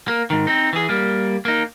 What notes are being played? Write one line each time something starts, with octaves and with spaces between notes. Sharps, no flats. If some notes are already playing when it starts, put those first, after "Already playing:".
A#3
G#2 D#3
C4 D#4
E3 G#4
G3 A#3
A#3 D#4